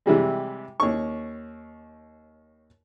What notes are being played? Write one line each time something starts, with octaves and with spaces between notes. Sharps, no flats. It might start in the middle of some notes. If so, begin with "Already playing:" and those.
C3 E3 G3 G#3
D#2 C#4 C#6